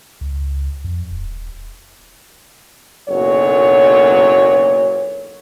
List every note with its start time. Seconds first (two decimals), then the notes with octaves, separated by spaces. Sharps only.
0.21 C#2
0.84 F2
1.11 D#1
3.08 F#1 B1 A#2 F#3 C#5